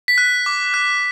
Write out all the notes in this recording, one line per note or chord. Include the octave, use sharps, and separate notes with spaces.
B6
F#6
D6
F#6